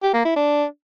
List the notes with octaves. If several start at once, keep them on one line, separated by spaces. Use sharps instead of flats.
G4
A#3
E4
D4